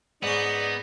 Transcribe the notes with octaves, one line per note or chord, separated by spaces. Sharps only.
G#2 B3 C#4 D#4 D5